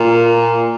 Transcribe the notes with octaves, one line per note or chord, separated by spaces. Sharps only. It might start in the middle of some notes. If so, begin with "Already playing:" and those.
Already playing: A#2